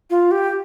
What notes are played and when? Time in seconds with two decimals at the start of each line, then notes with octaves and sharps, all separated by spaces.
0.10 F4
0.31 G4